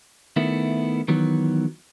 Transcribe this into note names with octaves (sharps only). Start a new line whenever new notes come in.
D#3 A3 B3 E4
D#3 E3 F#3 B3